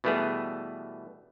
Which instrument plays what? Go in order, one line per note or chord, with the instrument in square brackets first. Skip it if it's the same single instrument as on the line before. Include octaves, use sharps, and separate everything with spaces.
[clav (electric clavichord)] B2 E3 G3 A3 B3 G#4